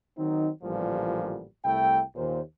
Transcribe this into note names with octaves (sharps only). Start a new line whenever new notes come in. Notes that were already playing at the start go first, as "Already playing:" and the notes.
D#3 F#3 C4 D#4
A1 A#2 D3 F3 G3
C2 A3 E4 G5
D#2 A#2 C5